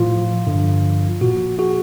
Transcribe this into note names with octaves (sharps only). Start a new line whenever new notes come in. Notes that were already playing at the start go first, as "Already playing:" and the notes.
Already playing: A2 F3 F4
G2 D3 F3
A#2 F3 F#4
F#4 G#4